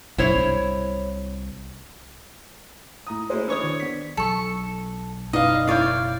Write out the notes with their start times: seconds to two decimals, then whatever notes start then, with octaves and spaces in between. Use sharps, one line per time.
0.18 F#1 B1 E4 C5 C#5
0.37 C2
3.07 A2 A#5 D#6
3.30 G#3 A3 C#4 E4 F#4 C5
3.48 E3 D4 A4 C5 C#5 C#6 D#6
3.64 D#3
3.80 B3 B6
4.17 B1 F#3 A4 C#6
5.33 F#1 B2 D#4 B4 D5 D#5 F5
5.67 E4 C#5 D5 F5 G6